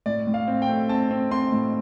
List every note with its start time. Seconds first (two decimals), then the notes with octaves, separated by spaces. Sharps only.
0.06 A2 D5
0.27 A2
0.34 F5
0.48 C4
0.62 G5
0.69 A3
0.89 C4 A5
1.11 C4
1.31 C4 C6
1.52 A2